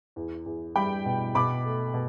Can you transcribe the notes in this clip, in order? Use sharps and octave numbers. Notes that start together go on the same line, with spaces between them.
E2
E2
G3 G5 B5
B2
B2 B5 D6
A3
B2